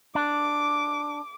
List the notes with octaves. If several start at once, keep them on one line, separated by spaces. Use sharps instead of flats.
D4 D6